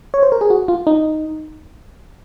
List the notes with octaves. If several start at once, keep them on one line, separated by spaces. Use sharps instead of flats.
C#5
C5
A#4
G#4
F#4
F4
D#4